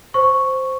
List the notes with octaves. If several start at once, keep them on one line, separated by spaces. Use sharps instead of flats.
C5 C#6